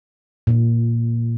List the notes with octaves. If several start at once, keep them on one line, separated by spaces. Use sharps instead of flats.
A#2